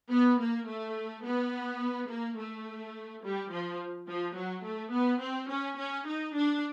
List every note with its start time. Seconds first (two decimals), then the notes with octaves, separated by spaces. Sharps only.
0.10 B3
0.40 A#3
0.67 A3
1.25 B3
2.09 A#3
2.38 A3
3.23 G3
3.51 F3
4.08 F3
4.36 F#3
4.64 A3
4.92 B3
5.21 C4
5.49 C#4
5.79 C#4
6.07 D#4
6.35 D4